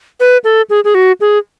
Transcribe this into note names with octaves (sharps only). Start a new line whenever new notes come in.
B4
A4
G#4
G#4
F#4
G#4